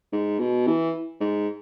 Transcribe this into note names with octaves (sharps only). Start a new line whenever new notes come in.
G#2
B2
E3
G#2